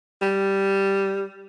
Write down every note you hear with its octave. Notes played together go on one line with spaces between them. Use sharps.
G3